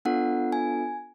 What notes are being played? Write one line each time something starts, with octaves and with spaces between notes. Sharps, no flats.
B3 D4 F4 A4 F#5
G#5